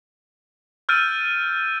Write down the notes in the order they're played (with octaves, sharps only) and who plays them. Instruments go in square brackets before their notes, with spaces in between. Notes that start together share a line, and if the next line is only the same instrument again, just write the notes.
[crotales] E6 F6 G6 A6 D7 D#7